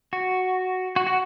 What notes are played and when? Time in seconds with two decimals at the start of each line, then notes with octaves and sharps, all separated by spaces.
0.13 F#4
0.96 F#4
1.07 F#4